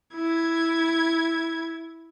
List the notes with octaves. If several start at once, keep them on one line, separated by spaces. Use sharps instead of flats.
E4 G#6